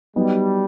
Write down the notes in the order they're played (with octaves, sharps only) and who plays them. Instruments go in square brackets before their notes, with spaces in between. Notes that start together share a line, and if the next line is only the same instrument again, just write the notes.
[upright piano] F#3 B3 D#4 [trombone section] G3